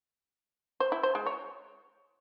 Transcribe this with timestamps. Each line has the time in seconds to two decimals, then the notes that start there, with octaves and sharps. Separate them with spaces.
0.80 C5
0.92 E4
1.03 C5
1.15 G#3
1.26 C#5